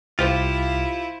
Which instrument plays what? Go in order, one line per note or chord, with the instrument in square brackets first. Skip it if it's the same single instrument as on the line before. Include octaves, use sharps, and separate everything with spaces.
[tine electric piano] C2 [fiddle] E4 [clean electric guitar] F4 G4 [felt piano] C5 F5